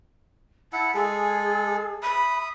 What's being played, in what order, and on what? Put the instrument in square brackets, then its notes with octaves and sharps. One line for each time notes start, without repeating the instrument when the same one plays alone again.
[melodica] E4 F#5 [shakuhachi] A5
[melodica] G#3 A4 [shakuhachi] G#4
[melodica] E5 D#6 [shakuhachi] B5